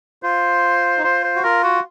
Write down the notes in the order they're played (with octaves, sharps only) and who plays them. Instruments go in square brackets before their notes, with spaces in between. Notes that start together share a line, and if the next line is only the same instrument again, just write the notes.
[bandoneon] F4 [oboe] C5
[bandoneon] D#4
[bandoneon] F4 [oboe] C5
[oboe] C5
[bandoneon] F#4
[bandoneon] F4 [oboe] A#4
[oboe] F#4